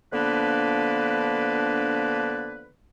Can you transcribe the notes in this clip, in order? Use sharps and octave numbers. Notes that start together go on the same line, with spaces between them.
D3 F3 A#3 B3 D4 B4